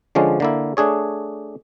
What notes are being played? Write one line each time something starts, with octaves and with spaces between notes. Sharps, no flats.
D3 F3 G#3 C#4 D4
D3 A#3 E4
A3 D4 G#4 C#5